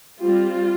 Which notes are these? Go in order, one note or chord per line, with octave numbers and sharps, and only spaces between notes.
G3 C4 F4